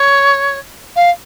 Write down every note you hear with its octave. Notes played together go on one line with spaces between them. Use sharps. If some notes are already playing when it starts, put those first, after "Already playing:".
Already playing: C#5
F5